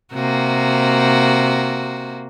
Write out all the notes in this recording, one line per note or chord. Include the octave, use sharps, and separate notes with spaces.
C3 A#3 F#4